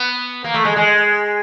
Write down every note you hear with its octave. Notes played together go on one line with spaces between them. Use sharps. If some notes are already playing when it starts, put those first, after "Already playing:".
Already playing: B3
A#3
A3
G#3
G#3